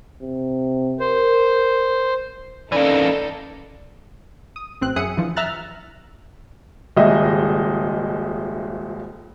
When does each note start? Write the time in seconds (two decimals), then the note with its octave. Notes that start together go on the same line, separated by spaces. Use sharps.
0.22 C3
1.00 A#4 C5
2.72 E3 A#3 C#4 D#4 A4 D5
4.56 D#6
4.81 A1 C4 F#6
4.96 F#2 G#4 E5 D#6 F#6 C#7
5.17 G2 E3 F3
5.36 E5 A#5 F6 F#6 A6
6.97 D#1 G#1 C#2 D#5 E5